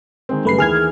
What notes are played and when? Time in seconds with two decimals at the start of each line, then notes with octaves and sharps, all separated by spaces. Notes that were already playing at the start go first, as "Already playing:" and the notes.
0.29 D#3 G#3 C4
0.45 F#2 C#3 G3 A3 B4 C7
0.58 D#2 E3 G#4 F6 G#6